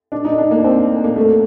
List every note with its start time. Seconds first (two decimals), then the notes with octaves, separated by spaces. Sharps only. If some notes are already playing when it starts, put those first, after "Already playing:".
0.12 D4
0.25 D#4
0.38 D4
0.51 A#3
0.64 C4
1.04 A#3
1.16 A3